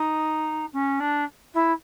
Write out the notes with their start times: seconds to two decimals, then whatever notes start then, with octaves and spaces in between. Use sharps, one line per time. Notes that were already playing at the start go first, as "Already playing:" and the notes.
Already playing: D#4
0.73 C#4
1.00 D4
1.54 E4